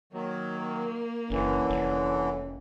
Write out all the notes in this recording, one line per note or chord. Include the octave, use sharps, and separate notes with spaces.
D#3 F#3 A#3
F#1 D3 E3 C#4
F1